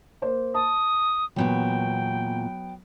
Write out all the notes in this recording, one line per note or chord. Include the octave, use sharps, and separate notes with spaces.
A#3 C5
A5 D#6
E2 A#2 F#3 B3 F#4 G5